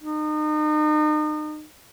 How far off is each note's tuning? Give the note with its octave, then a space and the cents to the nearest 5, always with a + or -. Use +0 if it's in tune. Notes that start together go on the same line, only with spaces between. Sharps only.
D#4 -35